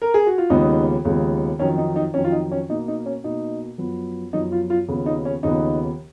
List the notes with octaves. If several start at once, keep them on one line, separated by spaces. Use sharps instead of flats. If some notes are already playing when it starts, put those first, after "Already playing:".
A#4
G#4
F#4
F4
D#2 C#3 F3 G#3 B3 D#4
D#2 C#3 F3 G#3 B3
F2 D#3 F#3 C#4
D#4
D#4
F2 D#3 F#3 C#4
F4
D#4
C#4
B2 A#3 D#4
D#4
C#4
B2 A#3 D#4
F#2 F3 B3
F#2 F3 B3 D#4
F4
F4
D#2 C#3 F3 B3
D#4
C#4
D#2 C#3 F3 B3 D#4